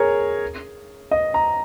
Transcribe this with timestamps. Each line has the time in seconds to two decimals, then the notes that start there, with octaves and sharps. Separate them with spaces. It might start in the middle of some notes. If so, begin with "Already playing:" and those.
Already playing: G#4 A#4 C#5
1.11 D#5
1.34 A#5